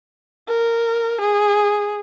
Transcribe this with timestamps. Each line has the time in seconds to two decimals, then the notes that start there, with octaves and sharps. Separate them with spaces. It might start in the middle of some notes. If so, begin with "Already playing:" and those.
0.48 A#4
1.21 G#4